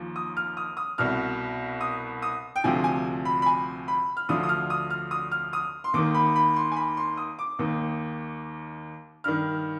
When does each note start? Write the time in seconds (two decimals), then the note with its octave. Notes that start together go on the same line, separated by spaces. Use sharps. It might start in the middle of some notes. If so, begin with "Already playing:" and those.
Already playing: D#2 F3
0.16 D#6
0.37 F6
0.57 D#6
0.77 D#6
0.98 C2 B2 F6
1.81 D#6
2.22 D#6
2.56 G5
2.64 D2 C3 F3 G#5
2.84 G#5
3.25 B5
3.42 B5
3.46 G#5
3.88 B5
4.17 F6
4.29 D2 D3 F3 D#6
4.43 D#6
4.49 F6
4.70 D#6
4.90 F6
5.11 D#6
5.32 F6
5.53 D#6
5.84 C6
5.94 D#2 D#3 D6
6.15 B5
6.36 B5
6.56 C6
6.72 G#5
6.76 B5
6.97 C6
7.17 D#6
7.39 D6
7.59 D#2 D#3
9.24 G2 D#3 F6